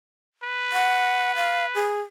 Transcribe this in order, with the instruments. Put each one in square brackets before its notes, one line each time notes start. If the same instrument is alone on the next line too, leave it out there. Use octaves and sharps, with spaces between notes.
[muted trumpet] B4
[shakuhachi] F#5
F5
G#4